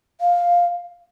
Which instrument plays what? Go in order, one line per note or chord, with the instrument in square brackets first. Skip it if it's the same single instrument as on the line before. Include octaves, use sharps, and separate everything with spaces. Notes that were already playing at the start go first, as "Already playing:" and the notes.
[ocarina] F5